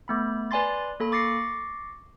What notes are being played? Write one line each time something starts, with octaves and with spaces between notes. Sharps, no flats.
A3 B3 B5
B4 D5 G#5 B5 C6 A6
A#3 A4 B5
C#6 D6 A6 A#6 C7 C#7